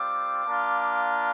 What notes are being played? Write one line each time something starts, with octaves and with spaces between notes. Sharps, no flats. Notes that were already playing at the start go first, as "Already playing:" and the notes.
Already playing: G3 C4 F4 D6
A#3 D4 F4